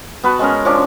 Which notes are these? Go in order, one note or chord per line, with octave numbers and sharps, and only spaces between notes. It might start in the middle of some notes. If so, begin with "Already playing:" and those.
B3 F#4 B4 A5
G#3 C#4 A#4
F3 C#4 D4